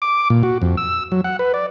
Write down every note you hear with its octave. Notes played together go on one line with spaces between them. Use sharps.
D6
A#2
F#4
F2
E6
F#3
F#5
B4
D5